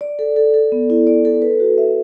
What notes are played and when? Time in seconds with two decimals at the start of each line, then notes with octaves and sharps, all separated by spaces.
0.01 D5
0.19 A4
0.36 A4
0.54 A4
0.72 B3
0.90 E4
1.07 D5
1.25 A4
1.42 B4
1.60 F#4
1.78 E5